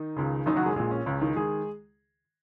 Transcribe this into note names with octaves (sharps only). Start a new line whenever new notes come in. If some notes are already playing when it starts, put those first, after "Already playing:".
Already playing: D#3 D#4
C#2 C#3
F#1 F#2 D#3 D#4
F#3 F#4
G#3 G#4
A#1 A#2 G#3 G#4
C#4
C#2 C#3 C#4
D#3 D#4
D#3 G#3 G#4